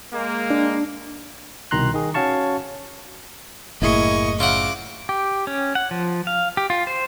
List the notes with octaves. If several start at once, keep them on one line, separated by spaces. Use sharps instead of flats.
G#3 A#3
D4
C2 B2 D#3 A#5 C6 F#6
D#3 G#4
C#4 F#4 C#5 F5 A5 C#6
F#1 A2 A#3 E4 G#4 D#5 C#6
C#3 F4 E5 F#5 D6
G4
C#4
F#5
F3
F5
G4
F4
C5